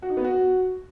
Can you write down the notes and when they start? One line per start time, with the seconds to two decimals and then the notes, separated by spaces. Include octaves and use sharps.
0.02 F#4
0.10 D#4
0.17 B3
0.24 F#4